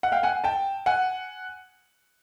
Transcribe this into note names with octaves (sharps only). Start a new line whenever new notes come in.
F#5
F5 G5
F#5 G#5
G5 A5
F#5 G#5